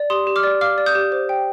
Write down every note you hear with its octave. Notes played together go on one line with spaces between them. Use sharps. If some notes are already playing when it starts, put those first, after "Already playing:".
Already playing: D5
G4 C6 D#6
G4
D6 F6
D5
F5 D6 F6
D5
D#6 G6
G4
C5
G5